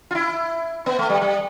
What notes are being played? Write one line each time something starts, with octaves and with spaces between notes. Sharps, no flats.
F4
E4
B3
A3
G3
G3